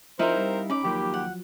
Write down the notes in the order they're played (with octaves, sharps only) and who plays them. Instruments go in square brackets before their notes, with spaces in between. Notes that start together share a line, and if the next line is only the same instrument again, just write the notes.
[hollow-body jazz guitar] F3 [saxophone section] C4 A#4 C5 [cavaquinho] D#4 E4 F5
[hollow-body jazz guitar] G3
[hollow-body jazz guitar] C#4 D#4 [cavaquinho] B5 D6
[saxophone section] D#2 G4 [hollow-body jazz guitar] F3 F#3
[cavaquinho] F#5